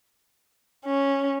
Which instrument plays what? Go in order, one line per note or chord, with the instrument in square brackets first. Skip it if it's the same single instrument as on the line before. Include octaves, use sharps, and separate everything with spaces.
[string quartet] C#4